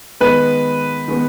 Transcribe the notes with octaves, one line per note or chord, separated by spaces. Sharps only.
D#3 G#3 B3 B4
D#3 G#3 B3